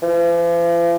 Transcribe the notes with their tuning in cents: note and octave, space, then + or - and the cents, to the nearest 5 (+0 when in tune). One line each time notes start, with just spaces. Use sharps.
F3 -45